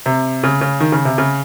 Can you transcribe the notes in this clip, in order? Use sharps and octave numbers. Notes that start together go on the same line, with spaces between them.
C3
C#3
C#3
D#3
C#3
C3
C#3